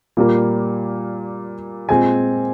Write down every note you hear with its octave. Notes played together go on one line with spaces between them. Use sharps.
A#2 G3 A#3
A#2 G#3 C4 G#5